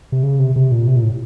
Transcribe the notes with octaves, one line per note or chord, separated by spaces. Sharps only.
C3
C#3
C3
C3
A#2
C3
A#2
A2